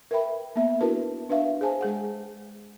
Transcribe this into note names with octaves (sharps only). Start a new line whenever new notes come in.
A#4 B4 E5 G5 B5
A#3 B3 E5
D4 E4 F#4 A#4 B4 A5
D4 B4 E5 F5
G#4 C5 G#5 A5
G#3 G#4 F#5